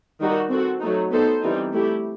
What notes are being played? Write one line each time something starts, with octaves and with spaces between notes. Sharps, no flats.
D#3 G3 D#4 F#4
C4 F#4 A4
F#3 A3 D#4
B3 D#4 A4 C5
E3 G3 C4 D#4
A3 E4 G4